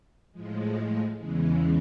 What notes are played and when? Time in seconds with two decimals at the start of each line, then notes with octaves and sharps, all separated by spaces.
0.32 A2 F3 G#3
1.16 E2 C#3 E3 G#3